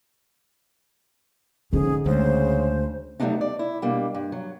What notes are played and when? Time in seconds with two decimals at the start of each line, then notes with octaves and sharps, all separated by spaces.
1.73 G#2 D3 C#4 G#4
2.06 D2 C#3 G#3 C5
3.20 F#3 G3 A3 B3 D4 D#4
3.41 D5
3.59 E4
3.82 B2 G3 A#3 D4
4.15 G2
4.32 F#3